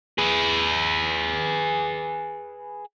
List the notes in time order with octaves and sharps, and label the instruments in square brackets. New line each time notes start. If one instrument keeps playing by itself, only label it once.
[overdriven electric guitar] G#4 B4